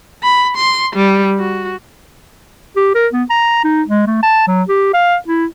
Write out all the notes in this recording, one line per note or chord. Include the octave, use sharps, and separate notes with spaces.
B5
C6
G3
F#4
G4
A#4
B3
A#5
D#4
G#3
A3
A5
F#3
G4
F5
E4